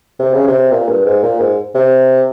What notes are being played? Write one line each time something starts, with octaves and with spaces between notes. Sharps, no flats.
C3
C#3
C3
A#2
G2
G#2
A#2
G#2
C3